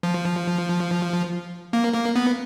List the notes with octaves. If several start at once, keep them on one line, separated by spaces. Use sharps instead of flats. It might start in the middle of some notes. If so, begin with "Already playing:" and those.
F3
A#3
A#3
B3